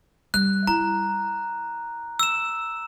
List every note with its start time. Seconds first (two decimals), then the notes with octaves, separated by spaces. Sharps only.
0.34 G3 F#6
0.67 E4 A#5
2.19 E6 E7